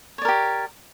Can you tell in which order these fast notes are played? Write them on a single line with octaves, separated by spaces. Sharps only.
C#5 D5 A#4 G4